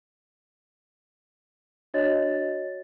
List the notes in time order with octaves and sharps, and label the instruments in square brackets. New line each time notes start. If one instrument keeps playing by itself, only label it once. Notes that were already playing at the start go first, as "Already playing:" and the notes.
[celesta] D4 F#4 C#5 D#5 A6